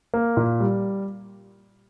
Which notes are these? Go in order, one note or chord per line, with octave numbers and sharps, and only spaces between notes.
A#3
A#2
G3